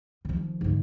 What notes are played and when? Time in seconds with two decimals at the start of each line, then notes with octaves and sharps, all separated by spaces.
0.25 D#3 F3
0.61 G#2 D3